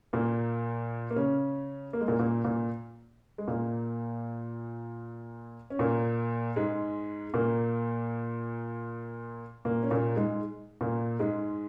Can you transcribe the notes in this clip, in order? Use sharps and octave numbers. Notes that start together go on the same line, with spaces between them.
A#2 A#3
A#3
C#3 C#4
A#3
G#3
A#2 A#3
A#2 A#3
A#2 A#3
G#3
A#2 A#3
C#4
A#2 A#3
G#2 G#3
A#2 A#3
A#2 A#3
C#4
A#2 A#3
G#2 G#3
A#2 A#3
G#2 G#3